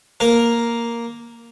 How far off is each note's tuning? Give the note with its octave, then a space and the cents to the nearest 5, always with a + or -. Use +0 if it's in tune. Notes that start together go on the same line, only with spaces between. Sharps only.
A#3 +0 A#4 +0